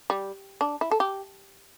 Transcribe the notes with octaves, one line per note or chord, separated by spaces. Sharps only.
G3
D4
E4
A4
G4